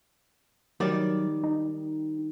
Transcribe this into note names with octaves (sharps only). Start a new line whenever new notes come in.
D#3 F#3 G3 D5
D#4